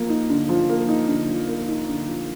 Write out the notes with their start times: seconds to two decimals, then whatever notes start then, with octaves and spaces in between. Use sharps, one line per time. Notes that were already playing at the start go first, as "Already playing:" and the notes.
Already playing: F3 A#3
0.09 D#4
0.30 D3
0.49 F3
0.69 A#3
0.88 D#4
1.08 D3
1.28 F3
1.48 A#3
1.68 D#4
1.88 D3
2.07 F3